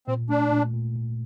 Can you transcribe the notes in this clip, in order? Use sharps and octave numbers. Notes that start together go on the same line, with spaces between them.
A#2 C4
A3 D4
A#2
A#2
A#2